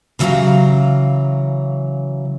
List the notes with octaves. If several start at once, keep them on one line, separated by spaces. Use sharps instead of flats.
C#3 E3 F#3 D5 F5 A#5